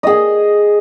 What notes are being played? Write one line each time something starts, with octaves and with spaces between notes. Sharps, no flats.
G#4 D#5